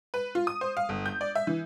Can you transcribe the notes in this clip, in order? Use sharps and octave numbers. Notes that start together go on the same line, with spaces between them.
B4
F4
D#6
C5
F5
G1
G6
D5
E5
E3